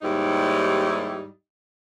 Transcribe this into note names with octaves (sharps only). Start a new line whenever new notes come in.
D#2 G#2 G3 D#4 E4 G4